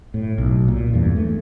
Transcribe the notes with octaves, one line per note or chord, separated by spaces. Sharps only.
A2
B1
A#2
E2 G2
A3